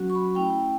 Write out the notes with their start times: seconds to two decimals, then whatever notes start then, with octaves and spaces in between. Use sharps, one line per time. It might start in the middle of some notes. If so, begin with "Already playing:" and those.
Already playing: F#3 C#4 F#4
0.10 C#6
0.15 B5
0.35 A3 C#4 E4 G5